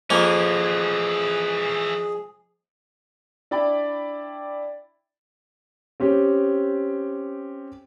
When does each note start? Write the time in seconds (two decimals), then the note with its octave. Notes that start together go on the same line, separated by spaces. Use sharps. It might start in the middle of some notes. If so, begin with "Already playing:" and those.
0.10 F2 E3 A#3 C#4 G#4
3.51 D4 E4 D5 G5 B5
6.00 C4 C#4 G4